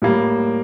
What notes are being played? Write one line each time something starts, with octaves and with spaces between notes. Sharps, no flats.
A2 G3 A#3